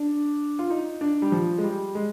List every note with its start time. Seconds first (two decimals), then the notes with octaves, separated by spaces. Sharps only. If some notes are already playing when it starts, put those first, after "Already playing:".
Already playing: D4
0.59 F4
0.70 D#4
1.01 D4
1.22 G3
1.32 F3
1.58 G#3
1.63 G3
1.95 G#3